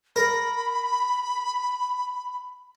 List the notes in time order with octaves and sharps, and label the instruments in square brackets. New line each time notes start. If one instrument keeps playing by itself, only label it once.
[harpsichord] A#4 [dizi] B5